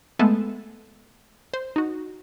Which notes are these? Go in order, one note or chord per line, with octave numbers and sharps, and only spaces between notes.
G#3 A3 B3 A4
C5
D#4 F#4